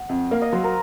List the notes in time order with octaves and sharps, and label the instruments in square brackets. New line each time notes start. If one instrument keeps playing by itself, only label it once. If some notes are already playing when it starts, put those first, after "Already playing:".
Already playing: [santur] F#5
[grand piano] F2
[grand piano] A#3 [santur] F5
[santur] D#5
[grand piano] F#3 [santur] C5
[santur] A#4